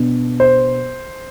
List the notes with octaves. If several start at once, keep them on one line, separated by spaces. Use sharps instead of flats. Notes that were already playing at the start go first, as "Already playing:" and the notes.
Already playing: B2 B3 D4
C5